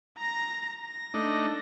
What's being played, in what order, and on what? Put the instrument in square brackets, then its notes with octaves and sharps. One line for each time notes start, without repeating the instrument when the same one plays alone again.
[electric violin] A#5 A#6
A#6
[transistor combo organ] A3 D4 D#4